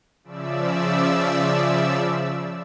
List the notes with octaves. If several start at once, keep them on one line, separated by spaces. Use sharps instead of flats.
C#3 F3 D5 E5 E6